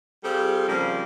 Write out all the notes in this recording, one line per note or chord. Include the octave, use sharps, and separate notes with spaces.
G3 C4 F4 G#4 A4
C#3 F3 G3 A#3 C4